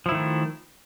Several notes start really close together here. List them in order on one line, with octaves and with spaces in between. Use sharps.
F3 E4 D#3 A3